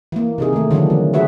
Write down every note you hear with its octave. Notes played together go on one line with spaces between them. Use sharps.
E3 A#3
C3 D#4 G#4
D#3 A3
D3 D#3 F3 F#3 B3 D4
F3
F#4 G#4 B4 E5